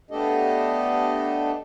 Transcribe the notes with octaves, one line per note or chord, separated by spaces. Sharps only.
A3 B3 D4 G4 A4 D#5